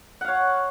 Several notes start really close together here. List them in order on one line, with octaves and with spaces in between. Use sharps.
F#5 F5 C#5